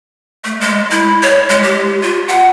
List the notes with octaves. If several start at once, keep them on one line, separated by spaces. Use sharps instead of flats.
A3
G#3
E4
C#5
G#3
G4
F4
F#5